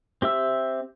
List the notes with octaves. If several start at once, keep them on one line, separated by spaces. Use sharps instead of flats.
C4 G4 E5 E6